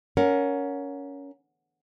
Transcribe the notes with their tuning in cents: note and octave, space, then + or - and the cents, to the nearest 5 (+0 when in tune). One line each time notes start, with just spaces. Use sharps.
C#4 +15 A#4 +5 F#5 -25